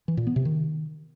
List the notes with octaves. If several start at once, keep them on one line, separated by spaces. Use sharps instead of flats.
E3
A#2
B3
C3
D#3